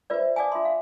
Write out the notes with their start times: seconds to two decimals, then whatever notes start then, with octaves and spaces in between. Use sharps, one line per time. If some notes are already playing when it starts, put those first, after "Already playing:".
0.10 F4 B4 C5 D5 E5
0.36 D5 F5 G#5 A5 D6 D#6
0.52 F4 E5 C6
0.65 F5